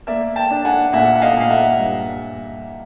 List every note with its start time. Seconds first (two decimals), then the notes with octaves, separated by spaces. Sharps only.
0.07 A#3 D5 E5
0.36 G5 A5
0.51 D4
0.65 F#5 G#5
0.93 A#2 E5 F#5
1.15 F#5
1.22 D#5 F5
1.37 A#2 F5
1.50 E5 F#5
1.79 G2